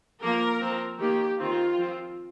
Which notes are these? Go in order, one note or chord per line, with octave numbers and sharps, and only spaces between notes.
F3 A#3 A#4
F3 C4
D#3 A#3 G4
D#3 C4 F4
F3 C4